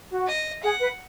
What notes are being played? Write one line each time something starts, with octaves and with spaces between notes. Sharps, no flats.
F#4
D#5
G#4 F#5
B4